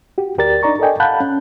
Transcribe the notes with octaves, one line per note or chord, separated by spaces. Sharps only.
F#4 G4
D2 G4 A#4 D5 A6
D4 D#4 D5 A#5 C#6
A4 A#4 D5 D#5 G5 G#5
F5 F#5 A5 B5 F#6 G6
C#4